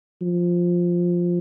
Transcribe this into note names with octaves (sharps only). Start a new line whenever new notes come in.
F3